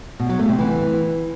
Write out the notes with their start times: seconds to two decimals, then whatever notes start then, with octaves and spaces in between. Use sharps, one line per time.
0.19 B2
0.29 F#3
0.39 A3
0.49 C3
0.58 E3